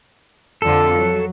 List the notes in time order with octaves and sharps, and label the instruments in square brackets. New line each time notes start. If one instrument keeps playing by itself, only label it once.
[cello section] F2 D3 F4 [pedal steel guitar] A4
[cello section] F#3